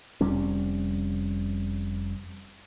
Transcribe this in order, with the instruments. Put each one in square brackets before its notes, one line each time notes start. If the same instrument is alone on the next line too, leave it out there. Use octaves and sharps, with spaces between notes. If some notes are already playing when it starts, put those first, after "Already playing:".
[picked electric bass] F1 C3 G3 C#4